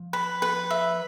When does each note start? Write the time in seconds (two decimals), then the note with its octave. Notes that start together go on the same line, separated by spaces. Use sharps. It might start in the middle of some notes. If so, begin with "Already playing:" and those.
Already playing: F3
0.13 B4
0.42 B4
0.71 E5